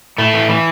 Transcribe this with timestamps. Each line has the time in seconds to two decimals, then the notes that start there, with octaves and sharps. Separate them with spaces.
0.18 A2 A3
0.34 E3
0.49 E3